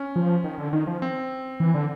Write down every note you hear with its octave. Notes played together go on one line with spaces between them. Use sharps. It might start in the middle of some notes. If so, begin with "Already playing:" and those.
Already playing: C#4
F3
D#3
D3
D#3
F3
C4
E3
D3